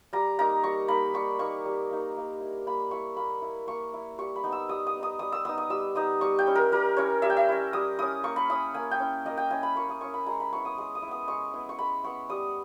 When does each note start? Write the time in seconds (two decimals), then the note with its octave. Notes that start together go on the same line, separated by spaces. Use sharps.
0.13 G3 A#5
0.39 A#3 D#4 A#5
0.64 G3 C#6
0.88 A#3 D#4 B5
1.14 G3 C#6
1.39 A#3 D#4 C#6
1.66 G3
1.91 A#3 D#4
2.16 A#3
2.40 E4
2.67 A#3 B5
2.91 E4 C#6
3.16 A#3 B5
3.42 E4
3.67 A#3 C#6
3.94 E4
4.18 G3 C#6
4.36 B5
4.43 B3 D#4
4.52 E6
4.69 G3 D#6
4.87 D#6
4.94 B3
4.99 D#4 D#6
5.19 G3 D#6
5.32 E6
5.45 B3 D#4 D#6
5.58 D#6
5.70 G3 E6
5.95 B3 D#4 D#6
6.21 G3 C#6
6.39 G5
6.47 C#4 E4
6.55 A#4
6.72 G3 A#4
6.97 C#4 E4 C#5
7.22 G3 E5
7.30 G5
7.37 E5
7.49 C#4 E4
7.73 G3 D#6
7.99 C#4 E4 D#6
8.24 A#3 C#6
8.36 B5
8.50 C#4 E4 D#6
8.74 A#3 G#5
8.91 G5
9.00 C#4 E4
9.25 A#3 D#5
9.37 G5
9.50 C#4 E4 G#5
9.63 B5
9.76 A#3 C#6
9.89 D#6
10.01 C#4 E4 C#6
10.14 B5
10.26 G#3 A#5
10.40 B5
10.53 B3 E4 C#6
10.65 D#6
10.78 G#3 D#6
10.95 D#6
11.02 E4
11.08 B3 D#6
11.28 G#3 C#6
11.54 B3 E4
11.69 C#6
11.79 G#3 B5
12.04 B3 E4 C#6
12.29 G3 D#6